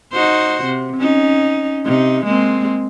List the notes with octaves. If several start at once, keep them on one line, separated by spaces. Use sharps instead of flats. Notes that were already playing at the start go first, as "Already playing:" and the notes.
D#4 F#4 C5
C3
C#4 D#4
C3 D#4
G#3 A#3 C4